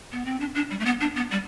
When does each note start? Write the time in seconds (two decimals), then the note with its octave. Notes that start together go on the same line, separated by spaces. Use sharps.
0.12 B3
0.25 C4
0.40 D4
0.55 D4
0.71 G3
0.80 A3
0.85 B3
1.01 D4
1.16 B3
1.31 G3